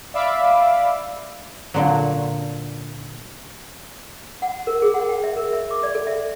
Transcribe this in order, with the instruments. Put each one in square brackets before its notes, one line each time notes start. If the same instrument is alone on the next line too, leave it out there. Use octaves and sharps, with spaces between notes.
[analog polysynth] D5 E5 F5 B5 D6 E6
[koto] A#2 D3 F#3
[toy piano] F#5
A#4
G#4
F#5
G5
E5
A#4
E5
D6
D5
A4
E5